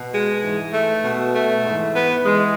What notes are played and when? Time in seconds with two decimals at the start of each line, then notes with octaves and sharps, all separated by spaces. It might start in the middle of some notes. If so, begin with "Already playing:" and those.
Already playing: B2
0.12 G#3
0.42 G#2 E3
0.73 A3
1.04 B2
1.34 A3
1.65 G#2 E3
1.95 B3
2.25 E3 G#3